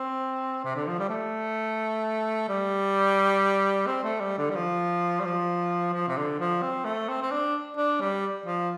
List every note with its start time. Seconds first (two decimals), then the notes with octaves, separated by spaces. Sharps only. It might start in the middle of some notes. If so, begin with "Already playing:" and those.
Already playing: C4
0.65 C3
0.75 D3
0.87 F3
0.98 G3
1.10 A3
2.48 G3
3.87 C4
4.04 A3
4.20 G3
4.38 D3
4.50 G3
4.55 F3
5.20 G3
5.25 F3
5.93 F3
6.08 C3
6.17 D3
6.40 F3
6.62 C4
6.85 A3
7.08 C4
7.22 C4
7.31 D4
7.77 D4
8.01 G3
8.46 F3